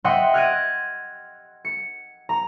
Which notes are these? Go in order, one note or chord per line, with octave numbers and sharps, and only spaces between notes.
D#5 E5 F#5 G5 C6
F6 F#6 G#6 A#6 D7 D#7
C#7
A#5